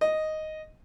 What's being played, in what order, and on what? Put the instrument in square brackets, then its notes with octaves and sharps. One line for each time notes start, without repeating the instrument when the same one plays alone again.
[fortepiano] D#5